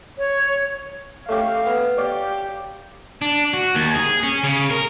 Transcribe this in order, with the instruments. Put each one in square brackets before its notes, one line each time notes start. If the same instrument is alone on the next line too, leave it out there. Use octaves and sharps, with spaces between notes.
[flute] C#5
[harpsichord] A3 C#4 G4 [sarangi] F5
[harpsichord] B3
[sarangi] G4 [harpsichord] C#5 D5 F5
[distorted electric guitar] D4
F#4
D#2
G#4
C#4
C#3
A#4